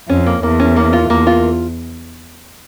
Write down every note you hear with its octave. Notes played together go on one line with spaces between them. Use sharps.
F2 C#4
A#3
E2 A#3
C#4
A#3
F4
E2 A#3
F4